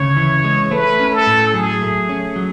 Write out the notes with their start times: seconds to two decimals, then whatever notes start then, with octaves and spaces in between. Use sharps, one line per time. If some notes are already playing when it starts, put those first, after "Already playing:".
Already playing: D2 C#3 C#5
0.17 E3
0.44 G#3
0.71 A3 B4
1.00 C#4
1.13 A4
1.26 A2
1.54 F#3 G#4
1.81 A3
2.09 C#4
2.36 F#3